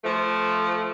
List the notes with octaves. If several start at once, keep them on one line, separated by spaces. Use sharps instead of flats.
F3 A3